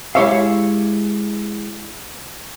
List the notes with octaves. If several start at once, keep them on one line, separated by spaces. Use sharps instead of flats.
G#3 E4 G4 C#5 E5 F5